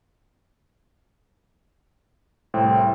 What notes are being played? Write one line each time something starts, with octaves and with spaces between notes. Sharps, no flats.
C2 A2 C4